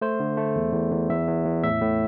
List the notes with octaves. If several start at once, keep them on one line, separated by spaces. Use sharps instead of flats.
A3 C5
D3
A3
E2
E2
E2
E2 E5
E2
E2
A2 E5
A2